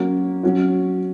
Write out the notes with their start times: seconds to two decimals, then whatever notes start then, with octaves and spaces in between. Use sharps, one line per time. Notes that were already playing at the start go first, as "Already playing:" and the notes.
Already playing: F#3 A#3 C#4 F#4
0.43 F#3 C#4 F#4